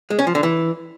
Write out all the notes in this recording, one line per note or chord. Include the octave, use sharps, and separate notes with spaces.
G#3
C#4
F3
D3
E3